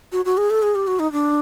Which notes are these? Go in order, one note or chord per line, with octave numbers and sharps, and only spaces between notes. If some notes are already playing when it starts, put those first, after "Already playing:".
F#4
F#4
G#4
A4
G#4
G4
F#4
D#4
D4